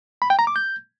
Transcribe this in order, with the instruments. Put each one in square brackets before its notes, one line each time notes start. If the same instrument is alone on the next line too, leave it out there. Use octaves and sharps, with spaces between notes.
[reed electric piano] B5
G5
A#5
D6
G6